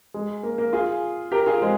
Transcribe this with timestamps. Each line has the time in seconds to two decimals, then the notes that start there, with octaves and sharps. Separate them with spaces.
0.14 G#3
0.43 A#3
0.58 A#3
0.73 F4 G#4
1.32 G4 A#4
1.46 F4 G#4
1.62 G#3 C4